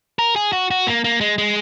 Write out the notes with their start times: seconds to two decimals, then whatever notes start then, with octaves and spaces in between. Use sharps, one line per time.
0.19 A#4
0.36 G#4
0.52 F#4
0.71 F#4
0.87 A#3
1.04 A#3
1.21 G#3
1.38 G#3